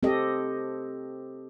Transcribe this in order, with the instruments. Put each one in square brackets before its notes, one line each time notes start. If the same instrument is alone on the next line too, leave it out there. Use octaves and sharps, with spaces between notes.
[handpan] C4 G4 A4 D#5